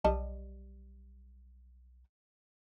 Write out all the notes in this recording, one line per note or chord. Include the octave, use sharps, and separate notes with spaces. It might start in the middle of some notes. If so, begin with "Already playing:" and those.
B1 G3 D#5 A5